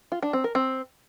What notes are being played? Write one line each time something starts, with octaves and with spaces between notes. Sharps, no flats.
F4
D4
C4
A#4
C4